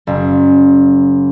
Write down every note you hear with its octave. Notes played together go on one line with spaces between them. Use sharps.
F#1